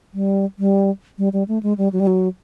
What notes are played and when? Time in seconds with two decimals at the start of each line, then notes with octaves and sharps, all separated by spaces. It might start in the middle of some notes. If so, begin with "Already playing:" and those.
0.14 G3
0.59 G3
1.18 G3
1.33 G3
1.48 A3
1.63 G#3
1.78 G3
1.93 F#3
2.00 G3
2.07 F#3